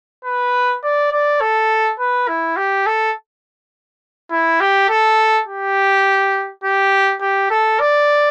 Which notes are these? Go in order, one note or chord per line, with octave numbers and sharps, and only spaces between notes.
B4
D5
D5
A4
B4
E4
G4
A4
E4
G4
A4
G4
G4
G4
A4
D5